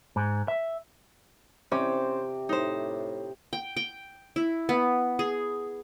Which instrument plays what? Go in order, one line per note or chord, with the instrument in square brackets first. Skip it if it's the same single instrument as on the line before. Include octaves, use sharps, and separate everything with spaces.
[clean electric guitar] G#2
E5
[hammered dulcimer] C3 D6 [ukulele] C#4 [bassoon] C5
[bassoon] A2 [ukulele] D#4 C5
[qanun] G5
G5
E4
B3
G#4